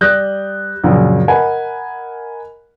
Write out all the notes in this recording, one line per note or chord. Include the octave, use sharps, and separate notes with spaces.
G3 D5 D#6 F#6 G6 A#6
A#1 F#2 C#3
A#4 D#5 F#5 G#5 B5